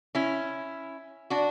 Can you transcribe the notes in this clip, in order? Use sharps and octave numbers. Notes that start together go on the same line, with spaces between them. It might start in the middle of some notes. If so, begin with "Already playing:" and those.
C#4 E4
D4 F#4